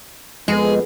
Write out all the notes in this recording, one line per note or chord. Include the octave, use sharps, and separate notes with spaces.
F2 G#3 B3 G#4